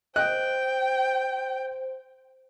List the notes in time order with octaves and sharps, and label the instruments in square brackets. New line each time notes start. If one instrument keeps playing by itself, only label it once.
[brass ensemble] C5 [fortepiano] D#5 F#6 [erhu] G5